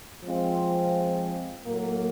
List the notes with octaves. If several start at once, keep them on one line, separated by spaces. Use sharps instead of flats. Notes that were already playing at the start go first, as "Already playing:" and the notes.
F3 G#3 C4 F4
A2 F#3 A#3